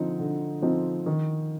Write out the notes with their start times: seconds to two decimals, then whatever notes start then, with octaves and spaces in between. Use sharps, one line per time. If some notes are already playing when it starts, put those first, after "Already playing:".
Already playing: D3 F3 C4 D#4
0.19 D3
0.62 F3 C4 D#4
1.06 D#3